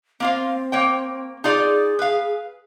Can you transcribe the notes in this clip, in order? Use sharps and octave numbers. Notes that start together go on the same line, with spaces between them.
A#3 C4 F4 F5
A#3 C#5 G5
D#4 F4 G#4 D5
B4 F5